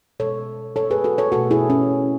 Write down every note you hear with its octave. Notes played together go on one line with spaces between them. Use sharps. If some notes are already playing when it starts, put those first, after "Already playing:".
B2 G#3 A4 C#5
A4 C#5
G#4 B4
F#4 A4
A4 C#5
B2 A3 F#4 A4
E4 G#4
C#4